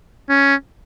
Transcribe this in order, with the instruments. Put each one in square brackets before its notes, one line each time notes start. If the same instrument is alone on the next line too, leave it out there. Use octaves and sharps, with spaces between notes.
[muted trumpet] C#4